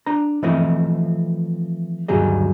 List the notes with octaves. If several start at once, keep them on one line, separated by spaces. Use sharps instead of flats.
D4 A#5
E3 F3 A3 C4 E4 D#5
D2 G2 D#3 F#3 G#4 D#5